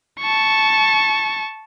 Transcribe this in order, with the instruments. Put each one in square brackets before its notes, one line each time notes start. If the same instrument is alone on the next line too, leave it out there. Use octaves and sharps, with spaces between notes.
[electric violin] A5 C#6